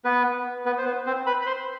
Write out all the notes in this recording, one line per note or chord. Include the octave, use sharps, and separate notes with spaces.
B3 B4
B3 B4
C5
B3 B4
C4 C5
B4 B5
B5
C5 C6